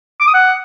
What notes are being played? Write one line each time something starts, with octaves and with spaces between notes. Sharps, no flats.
D6
D#6
F#5